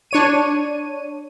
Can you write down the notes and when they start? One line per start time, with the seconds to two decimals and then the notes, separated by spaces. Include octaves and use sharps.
0.11 D4 C#5 D#7